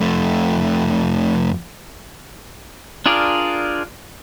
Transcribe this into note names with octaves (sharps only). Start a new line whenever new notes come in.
F2 A3
D4 F4 G#4 A#4 D5